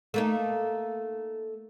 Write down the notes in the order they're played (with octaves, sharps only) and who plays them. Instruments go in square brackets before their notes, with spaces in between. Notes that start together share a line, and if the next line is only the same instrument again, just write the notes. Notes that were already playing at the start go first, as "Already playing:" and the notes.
[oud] A3 A#3 D#4